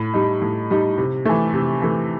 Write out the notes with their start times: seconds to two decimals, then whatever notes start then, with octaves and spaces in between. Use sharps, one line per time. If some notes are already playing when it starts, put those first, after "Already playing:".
Already playing: A2
0.14 G3 D#4
0.42 A2
0.70 G3 D#4
0.98 C3
1.25 E3 A3
1.53 C3
1.82 E3 A3